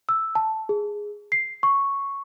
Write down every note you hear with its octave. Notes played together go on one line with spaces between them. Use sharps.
E6
A5
G#4
C7
C#6